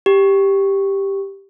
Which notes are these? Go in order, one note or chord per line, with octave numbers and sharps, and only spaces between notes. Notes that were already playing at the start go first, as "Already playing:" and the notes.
G4